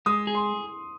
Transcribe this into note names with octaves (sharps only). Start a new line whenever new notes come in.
G#3 D#6
G#4
C6